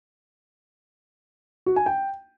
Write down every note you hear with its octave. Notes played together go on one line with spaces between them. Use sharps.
F#4
G#5
G5